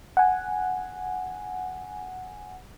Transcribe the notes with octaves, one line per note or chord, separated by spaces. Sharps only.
F#5 G#5